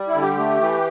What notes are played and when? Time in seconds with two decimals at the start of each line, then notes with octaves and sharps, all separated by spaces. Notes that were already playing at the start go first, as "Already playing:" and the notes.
Already playing: G3
0.08 E4
0.15 D3
0.22 G4
0.38 A3
0.60 E3